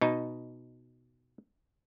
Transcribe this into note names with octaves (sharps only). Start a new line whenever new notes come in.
B2 D#4